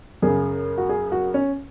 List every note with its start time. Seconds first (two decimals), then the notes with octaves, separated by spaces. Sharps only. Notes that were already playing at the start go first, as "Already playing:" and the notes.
0.22 F#2 C#3 G#4
0.78 F#4
0.89 G#4
1.12 F#4
1.34 C#4